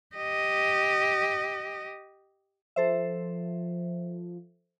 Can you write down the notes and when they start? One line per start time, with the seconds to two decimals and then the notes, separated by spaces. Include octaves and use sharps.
0.16 G4 D#5
2.76 F3 A4 C5 E5